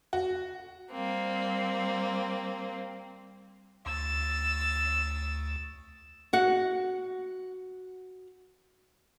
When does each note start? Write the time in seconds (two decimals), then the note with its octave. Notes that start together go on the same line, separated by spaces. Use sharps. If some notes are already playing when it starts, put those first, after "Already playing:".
0.13 F#4
0.91 G3 A#3 C4
3.86 D2 E6 A6
6.33 F#4 F#5